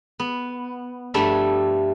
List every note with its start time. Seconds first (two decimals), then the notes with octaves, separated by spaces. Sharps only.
0.20 B3
1.14 G2 F3 G3 A3 A4 E5